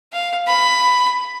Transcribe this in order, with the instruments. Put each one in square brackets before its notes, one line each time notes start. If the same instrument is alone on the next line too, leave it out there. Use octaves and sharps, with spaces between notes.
[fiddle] F5
B5